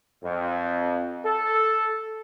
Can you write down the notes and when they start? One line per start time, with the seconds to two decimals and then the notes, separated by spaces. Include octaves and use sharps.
0.24 F2
1.25 A4